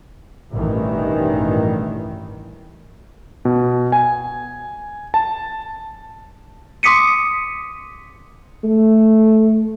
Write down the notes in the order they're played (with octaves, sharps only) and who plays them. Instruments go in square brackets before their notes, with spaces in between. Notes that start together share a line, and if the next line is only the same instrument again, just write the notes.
[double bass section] A1 G2 B2 D#3 E3
[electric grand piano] B2
G#5
A5
[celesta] C6 D6 D#6 B6 C#7 D#7
[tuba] A3